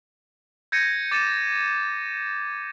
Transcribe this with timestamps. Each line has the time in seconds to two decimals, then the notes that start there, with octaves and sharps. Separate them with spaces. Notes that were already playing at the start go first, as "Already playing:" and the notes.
0.72 G6 G#6 A#6 C#7 D#7
1.11 D6 A6 C#7 D#7 E7